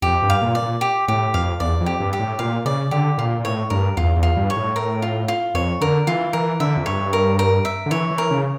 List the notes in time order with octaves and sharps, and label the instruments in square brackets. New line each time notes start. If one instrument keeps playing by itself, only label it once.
[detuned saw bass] F2 [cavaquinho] G4
[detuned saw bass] G2
[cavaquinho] F5
[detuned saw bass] A#2
[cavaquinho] D5
[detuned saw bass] A#2
[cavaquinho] G4
[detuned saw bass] A2 [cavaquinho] G4
[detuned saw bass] F2 [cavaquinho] F5
[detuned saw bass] E2 [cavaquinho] D5
[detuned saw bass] F2
[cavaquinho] G4
[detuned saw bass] G2
[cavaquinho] G4
[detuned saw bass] A2
[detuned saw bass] A#2 [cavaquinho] F5
[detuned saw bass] C#3 [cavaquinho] D5
[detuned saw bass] D3 [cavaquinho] G4
[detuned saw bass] A#2 [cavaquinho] F4
[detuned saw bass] A#2
[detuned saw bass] A2 [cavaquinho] C#5
[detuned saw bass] G2 [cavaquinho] A#4
[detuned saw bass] E2 [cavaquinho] F4
[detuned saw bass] E2
[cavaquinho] F4
[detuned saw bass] G2
[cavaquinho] C#5
[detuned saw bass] A2
[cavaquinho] A#4
F4
F4
[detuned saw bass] F2 [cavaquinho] C#5
[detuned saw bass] D3 [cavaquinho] A#4
[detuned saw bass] E3 [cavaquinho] F4
[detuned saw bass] E3 [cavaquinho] A#4
[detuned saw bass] D3 [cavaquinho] E5
[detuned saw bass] F2
[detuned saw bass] G2 [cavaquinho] C#5
[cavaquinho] A#4
A#4
E5
[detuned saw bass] D3
[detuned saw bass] E3 [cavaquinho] C#5
[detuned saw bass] E3
[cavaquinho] A#4
[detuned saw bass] C#3